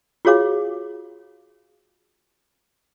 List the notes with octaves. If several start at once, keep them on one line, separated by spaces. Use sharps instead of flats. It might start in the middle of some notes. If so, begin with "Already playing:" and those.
F4 F#4 G#4 C#5 F5 D6